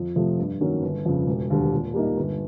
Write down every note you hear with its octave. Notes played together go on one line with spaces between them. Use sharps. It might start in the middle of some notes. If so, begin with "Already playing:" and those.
Already playing: F2
C3 F3 A3
G2
D#3 F#3 A#3 C#4
G1
F2 C#3
E1
D#2 D3 G3
A#2
G3 A#3 D#4
G1